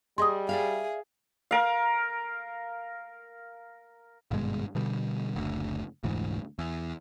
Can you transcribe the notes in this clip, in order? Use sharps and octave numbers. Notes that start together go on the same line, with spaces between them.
G3 G#4 D#5 C6 D#6
G#4 D5 E5 F5
A#4 F5
G#1 G2 B2 G#3
B2 D3 G3
F#1 D2
F1 D2 G#2 E3
E2